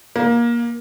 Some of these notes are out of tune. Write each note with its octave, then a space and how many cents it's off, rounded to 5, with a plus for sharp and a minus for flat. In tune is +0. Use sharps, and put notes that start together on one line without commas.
A#3 +20